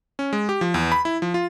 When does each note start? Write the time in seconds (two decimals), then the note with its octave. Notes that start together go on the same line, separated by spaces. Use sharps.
0.19 C#4
0.33 G#3
0.49 G4
0.61 F3
0.74 E2
0.92 B5
1.05 E4
1.22 F3
1.34 F4